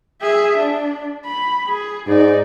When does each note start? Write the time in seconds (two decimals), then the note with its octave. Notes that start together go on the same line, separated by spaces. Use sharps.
0.22 G#4 E5
0.57 D4
1.25 B5
1.68 G#4
2.07 G#2 D#4 D5